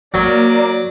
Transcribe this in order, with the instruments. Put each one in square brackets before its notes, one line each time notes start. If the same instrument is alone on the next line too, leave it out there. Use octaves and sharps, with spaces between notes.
[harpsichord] F#3 [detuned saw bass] A#3 [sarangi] D5